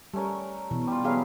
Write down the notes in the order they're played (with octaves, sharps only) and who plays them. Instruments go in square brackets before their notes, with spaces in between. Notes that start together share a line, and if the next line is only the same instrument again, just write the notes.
[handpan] G3 [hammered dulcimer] A3 C#4 A#4
[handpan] B2 E3
[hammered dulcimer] G3 F4
[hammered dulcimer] F#3 E4 G4 [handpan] B3 G#4 F5